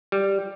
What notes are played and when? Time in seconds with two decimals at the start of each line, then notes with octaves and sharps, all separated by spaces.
0.12 G3